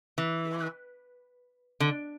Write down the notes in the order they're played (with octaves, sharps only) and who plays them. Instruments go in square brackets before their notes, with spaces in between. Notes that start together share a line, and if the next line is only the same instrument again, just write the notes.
[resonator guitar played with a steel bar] E3
D3